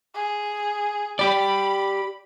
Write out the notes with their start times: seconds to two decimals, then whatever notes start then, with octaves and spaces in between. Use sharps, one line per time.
0.15 G#4
1.19 G4 D5 B5